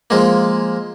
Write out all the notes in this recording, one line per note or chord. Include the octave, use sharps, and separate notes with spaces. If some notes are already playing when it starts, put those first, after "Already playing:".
F3 G#3 A#3